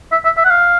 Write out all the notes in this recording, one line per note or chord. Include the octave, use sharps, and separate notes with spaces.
E5
E5
E5
F#5
F5